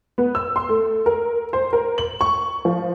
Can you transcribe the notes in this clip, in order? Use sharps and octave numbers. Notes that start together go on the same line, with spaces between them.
B3
E6
C6
A3
A#4
C5
A#4
F#7
C#6
F3